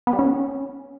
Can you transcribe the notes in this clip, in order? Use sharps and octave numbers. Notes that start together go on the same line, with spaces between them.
B3
G3
C#4